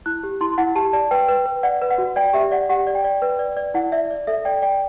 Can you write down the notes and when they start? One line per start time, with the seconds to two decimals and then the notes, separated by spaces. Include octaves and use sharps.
0.06 E4 F#6
0.23 G4
0.41 E4 C6
0.58 E4 F#5
0.75 G4 A5
0.93 D5 A5
1.11 B4 G5
1.28 B4
1.46 B4
1.63 D5 F#5
1.82 B4
1.90 F#5
1.98 F#4
2.16 D5 G5
2.33 G4 E5
2.51 D5 F#5
2.69 G4 F#5
2.87 D5
2.95 G5
3.04 D5
3.22 B4
3.39 D5
3.57 D5
3.74 E4 F#5
3.92 D5 E5
4.11 D5
4.27 A4 E5
4.45 D5 G5
4.62 D5 G5